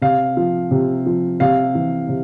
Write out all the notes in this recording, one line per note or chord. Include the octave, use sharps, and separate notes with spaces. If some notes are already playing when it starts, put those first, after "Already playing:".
C3 F5
F3
C3
F3
C3 F5
E3
C3